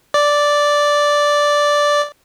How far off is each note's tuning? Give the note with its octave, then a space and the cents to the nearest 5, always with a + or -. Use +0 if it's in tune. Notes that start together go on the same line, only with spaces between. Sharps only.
D5 -5